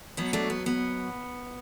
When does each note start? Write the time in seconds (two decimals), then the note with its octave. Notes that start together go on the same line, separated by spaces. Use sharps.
0.17 B2 F#3 B3
0.33 A3 D4
0.50 B3
0.66 B3